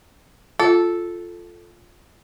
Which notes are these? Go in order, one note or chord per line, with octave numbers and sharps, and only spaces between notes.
F4 A4